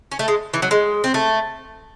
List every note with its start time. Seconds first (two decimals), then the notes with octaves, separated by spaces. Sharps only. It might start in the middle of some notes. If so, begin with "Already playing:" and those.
0.12 C#4
0.19 A3
0.28 G#3
0.54 E3
0.62 F#3
0.71 G#3
1.04 C4
1.14 A3